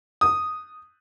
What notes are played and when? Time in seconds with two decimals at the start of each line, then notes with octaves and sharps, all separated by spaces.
0.21 D#6